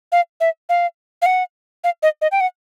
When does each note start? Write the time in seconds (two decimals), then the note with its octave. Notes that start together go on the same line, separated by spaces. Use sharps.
0.12 F5
0.40 E5
0.69 F5
1.22 F5
1.26 F#5
1.84 F5
2.03 D#5
2.22 D#5
2.32 G5
2.41 F#5